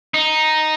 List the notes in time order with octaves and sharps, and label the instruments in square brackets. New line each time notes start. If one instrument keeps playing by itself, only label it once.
[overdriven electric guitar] D#4